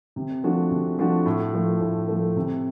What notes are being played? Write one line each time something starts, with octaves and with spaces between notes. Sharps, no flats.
C3
F3 A3 D4 F#4
C3
F3 A3 D4 F#4
A2
F3 A3
A2
F3 A3
C3